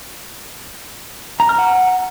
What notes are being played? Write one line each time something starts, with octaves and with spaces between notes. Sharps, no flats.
A#5
F6
F#5